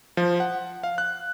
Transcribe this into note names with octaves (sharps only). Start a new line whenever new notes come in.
F3
F#5
F5
F#6